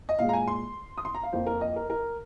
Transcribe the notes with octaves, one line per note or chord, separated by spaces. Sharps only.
D#5
A#2 G#3 F5
A#5
G#5
C6
D#6
C6
A#5
F5
F2 F3 A#3 C5
A#4
D#5
A#4
A#4